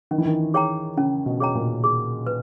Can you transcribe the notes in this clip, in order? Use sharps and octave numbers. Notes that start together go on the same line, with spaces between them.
D#3 C#4
E3
D#3
G#4 C#5 G5 A#5
C#3 C#4
B2
G#4 C#5 G5 A#5
A#2
G#4
B4